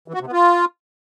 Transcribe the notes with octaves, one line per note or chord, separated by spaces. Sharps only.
E3
F#4
C3
B3
F4